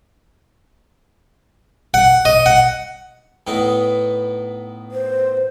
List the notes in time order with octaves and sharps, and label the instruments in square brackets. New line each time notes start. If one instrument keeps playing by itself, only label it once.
[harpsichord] F#5
D#5
F#5
A2 B3 D#4
[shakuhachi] C5